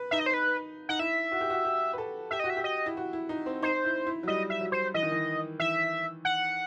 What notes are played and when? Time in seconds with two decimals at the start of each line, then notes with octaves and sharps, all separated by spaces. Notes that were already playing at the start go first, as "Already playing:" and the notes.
Already playing: B4
0.11 D#4 E5
0.20 D#5
0.26 C5
0.34 B4
0.89 D#4 F#5
0.99 E4 E5
1.32 F#4
1.41 G4
1.50 F#4
1.65 G4
1.93 B4
1.98 A4
2.31 G4 E5
2.40 D#5
2.44 F#4
2.50 E5
2.57 G4
2.64 D#5
2.86 E4
2.97 F#4
3.13 E4
3.29 D#4
3.46 C4
3.62 D#4 C5
3.85 E4
4.07 E4
4.23 F#3
4.28 G3 D#5
4.50 E5
4.61 F#3
4.72 C5
4.94 E3 D#5
5.03 D#3
5.12 E3
5.60 E3 E5
6.25 F#5